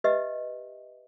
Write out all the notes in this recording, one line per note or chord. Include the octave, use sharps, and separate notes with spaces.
G4 B4 D#5 E5